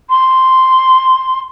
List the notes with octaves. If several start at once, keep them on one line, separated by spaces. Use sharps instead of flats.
C6